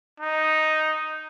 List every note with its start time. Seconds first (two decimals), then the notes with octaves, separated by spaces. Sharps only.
0.20 D#4